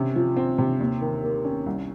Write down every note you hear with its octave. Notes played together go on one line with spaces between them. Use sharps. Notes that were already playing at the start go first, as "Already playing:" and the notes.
Already playing: C3 C#4
F3
C4
C3
D#2
D#3
A#3
C#4
C2